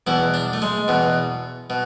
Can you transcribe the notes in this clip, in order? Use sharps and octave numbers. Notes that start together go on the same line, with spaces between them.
E2 B2 E4
D4
A3
G#3
E2 B2
B2